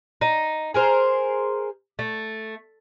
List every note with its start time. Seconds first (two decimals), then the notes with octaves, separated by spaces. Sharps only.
0.21 D#4
0.74 G#4 A#4 C5
1.99 A3